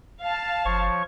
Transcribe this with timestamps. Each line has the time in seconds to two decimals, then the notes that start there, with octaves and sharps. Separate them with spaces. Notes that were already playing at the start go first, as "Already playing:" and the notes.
0.22 F5 A5
0.65 F#1 F3 C#5 C#6